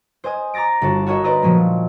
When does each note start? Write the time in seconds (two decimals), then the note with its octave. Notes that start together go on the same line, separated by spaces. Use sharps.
0.24 C5 D#5 G#5 D#6
0.54 A#5 D6 A6 A#6 D7
0.81 G1 F#4 A5
1.07 F#4 A#4 C#5 D#5 E5
1.24 B4 C5 D5 D#5 A#5 D#6
1.42 A#2 F3 F#3 A3